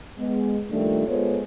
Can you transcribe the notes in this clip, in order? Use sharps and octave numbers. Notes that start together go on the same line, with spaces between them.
G#3 B3
A#2 D#3 F3 G3 A3 D4
G#3 B3 F4 A4 C5 C#5